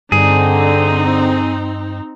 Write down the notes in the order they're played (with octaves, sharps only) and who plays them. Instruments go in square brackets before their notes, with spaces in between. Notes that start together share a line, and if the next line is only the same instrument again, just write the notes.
[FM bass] G2 [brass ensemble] D3 [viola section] C4 D#4 [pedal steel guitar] G#4